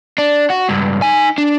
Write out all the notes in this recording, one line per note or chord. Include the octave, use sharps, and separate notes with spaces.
D4
F#4
C#2 G2
D#4 G#5
D4